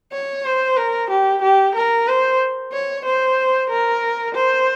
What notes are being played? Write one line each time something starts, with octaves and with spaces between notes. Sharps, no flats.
C#5
C5
A#4
G4
G4
A#4
C5
C#5
C5
A#4
C5